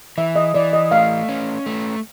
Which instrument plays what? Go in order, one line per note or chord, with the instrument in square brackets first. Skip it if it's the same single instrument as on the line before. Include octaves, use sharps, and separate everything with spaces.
[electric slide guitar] E3 [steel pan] E5
[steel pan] D#5
[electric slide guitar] E3 [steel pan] D5
[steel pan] D#5
[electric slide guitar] A3 [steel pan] F5
[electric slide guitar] C#4
A3